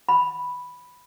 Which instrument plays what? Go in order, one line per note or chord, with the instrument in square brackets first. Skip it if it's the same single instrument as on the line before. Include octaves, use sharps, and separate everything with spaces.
[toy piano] B5